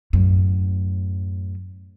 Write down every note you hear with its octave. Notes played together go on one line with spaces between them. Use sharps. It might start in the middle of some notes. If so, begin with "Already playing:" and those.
F#2 A2